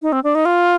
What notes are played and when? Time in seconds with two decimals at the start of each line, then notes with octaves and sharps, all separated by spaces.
0.02 D#4
0.12 C4
0.24 D4
0.35 D#4
0.45 F4